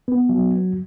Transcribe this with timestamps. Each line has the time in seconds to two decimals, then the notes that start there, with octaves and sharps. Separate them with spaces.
0.08 B3
0.29 F#3